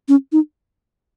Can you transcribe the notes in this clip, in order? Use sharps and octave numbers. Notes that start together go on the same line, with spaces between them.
C#4
D#4